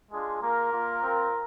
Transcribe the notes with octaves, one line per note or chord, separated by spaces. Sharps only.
G#3 D4 F4 G#4
A#3 F4 A#4
A#3 F4
C4 F4